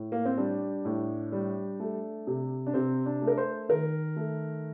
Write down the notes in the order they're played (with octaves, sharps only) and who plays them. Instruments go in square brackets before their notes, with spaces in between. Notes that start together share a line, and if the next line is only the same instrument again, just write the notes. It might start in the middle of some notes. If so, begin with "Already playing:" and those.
Already playing: [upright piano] A2
A#3
C4
G3 D4
A2
G3
A3
C3
D4
C3 C4
D4
A3
A#4
C5
D#3 A#4
A3